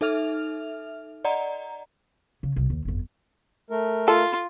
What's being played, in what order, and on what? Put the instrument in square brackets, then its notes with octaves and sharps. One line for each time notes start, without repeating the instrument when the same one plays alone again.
[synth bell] D#4 A4 E5 F6 F7
D5 D#5 F#5 A#5
[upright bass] C#3
C2
D#2
G1 F2
[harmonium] A3 A#4
[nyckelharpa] F4 [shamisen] A4